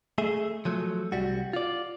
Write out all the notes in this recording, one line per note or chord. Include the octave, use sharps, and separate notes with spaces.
A3 G#4 E5
F3 F#3 A3
C2 G3 F#4
F4 D5